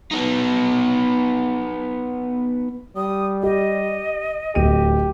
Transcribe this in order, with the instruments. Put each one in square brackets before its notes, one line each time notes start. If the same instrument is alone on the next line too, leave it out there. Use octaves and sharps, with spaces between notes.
[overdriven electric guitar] B3 D#4
[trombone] G3 [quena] D#6
[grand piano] G4 [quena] D#5
[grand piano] D1 D#7 [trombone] G4